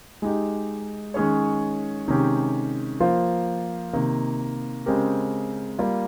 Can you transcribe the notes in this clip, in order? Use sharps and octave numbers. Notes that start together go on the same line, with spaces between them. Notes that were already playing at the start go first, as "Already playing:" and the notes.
G#3 D#4 G4
D#3 G#3 C#4 G#4 C#5
C3 D#3 G#3 C#4 G4
F3 A#3 F4 C5
C3 D#3 A#3
C#3 G#3 C4 G4 A#4
G3 A#3 F4